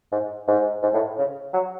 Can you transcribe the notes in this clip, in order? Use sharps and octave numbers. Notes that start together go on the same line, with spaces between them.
G#2
G#2
G#2
A2
C#3
F#3